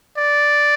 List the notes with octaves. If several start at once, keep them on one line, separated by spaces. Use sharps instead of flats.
D5